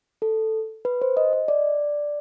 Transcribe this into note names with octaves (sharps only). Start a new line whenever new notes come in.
A4
B4
C5
D#5
D#5
D5